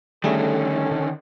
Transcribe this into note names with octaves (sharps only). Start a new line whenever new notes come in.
D3 D#3 G3 A3 C#4 G#4 A4